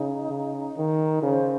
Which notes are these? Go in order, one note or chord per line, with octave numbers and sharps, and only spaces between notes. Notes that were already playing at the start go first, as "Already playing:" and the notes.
Already playing: C#3 D#4
C#3
D#3
C#3 C5